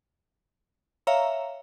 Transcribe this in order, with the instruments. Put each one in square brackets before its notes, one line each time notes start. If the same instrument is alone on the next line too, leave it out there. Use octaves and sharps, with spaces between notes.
[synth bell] C#5 E5 F5 A#5